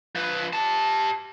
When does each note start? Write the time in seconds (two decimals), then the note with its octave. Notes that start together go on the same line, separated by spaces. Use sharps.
0.15 F3 B4
0.53 G4 A5